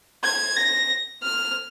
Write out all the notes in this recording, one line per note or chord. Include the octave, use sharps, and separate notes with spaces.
G#6
A#6
F6